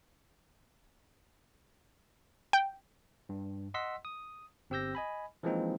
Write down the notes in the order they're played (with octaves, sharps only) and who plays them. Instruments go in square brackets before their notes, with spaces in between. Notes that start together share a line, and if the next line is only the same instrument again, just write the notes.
[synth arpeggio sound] G5
[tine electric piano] G2
D#5 F#5 C6 E6 B6
D#6
G1 C4 G4 E6 G6 A#6
D#5 G#5 B5
E3 F3 G#3 A#3 C4 D#4